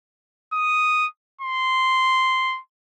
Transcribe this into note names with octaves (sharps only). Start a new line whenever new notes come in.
D#6
C6